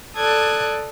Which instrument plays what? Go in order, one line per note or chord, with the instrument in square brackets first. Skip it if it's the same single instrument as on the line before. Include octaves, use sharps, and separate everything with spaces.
[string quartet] A4 D5 D#6 F#6 G#6